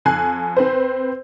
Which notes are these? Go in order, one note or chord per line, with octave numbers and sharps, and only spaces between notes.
F2 G#5 F#6 C7
C4 B4 C5